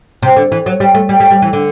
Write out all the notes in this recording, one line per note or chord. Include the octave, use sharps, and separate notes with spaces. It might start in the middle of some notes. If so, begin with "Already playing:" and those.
C3
D3
E3
F#3
G3
A3
G3
G3
G3
E3
D3